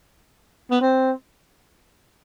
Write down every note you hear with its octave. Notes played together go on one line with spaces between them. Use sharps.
B3
C4